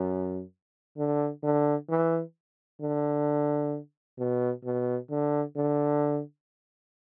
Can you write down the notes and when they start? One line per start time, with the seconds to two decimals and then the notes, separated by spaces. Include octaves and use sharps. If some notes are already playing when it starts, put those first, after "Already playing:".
Already playing: F#2
0.97 D3
1.43 D3
1.89 E3
2.81 D3
4.19 B2
4.65 B2
5.10 D3
5.56 D3